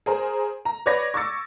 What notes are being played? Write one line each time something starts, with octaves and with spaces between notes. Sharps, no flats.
G#4 A#4 C5
A#5
B4 C#5 D5 D6 G#6 A#6
C#6 D6 E6 A6 C#7